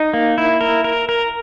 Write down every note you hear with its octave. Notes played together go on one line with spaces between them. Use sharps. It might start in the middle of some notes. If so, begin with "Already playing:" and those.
Already playing: D#4
A#3
E4
A#4
A#4
A#4